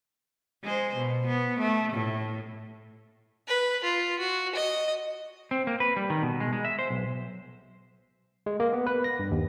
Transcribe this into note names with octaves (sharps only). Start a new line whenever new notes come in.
G#3 C5
B2
B3
A3
A2
B4
F4
F#4
D#5
C4
A#3
B4
G3
D#3
B2
G#3
G#3
E5
C5
B1
G#3
A#3
B3
B4
A#6
G2
D#2